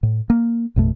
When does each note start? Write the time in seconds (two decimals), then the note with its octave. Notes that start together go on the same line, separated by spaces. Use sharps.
0.03 A2
0.30 A#3
0.76 A1 F2 B2 A3